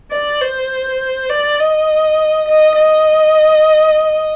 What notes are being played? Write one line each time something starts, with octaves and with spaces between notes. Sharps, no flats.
D5
C5
D5
D#5
D#5
D#5